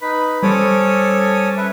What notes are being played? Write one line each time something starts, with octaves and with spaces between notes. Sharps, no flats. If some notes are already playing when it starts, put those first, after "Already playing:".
D#4 B4 B5
G3 C#4 A4 C5 C#5 D6 D#6
B4 E5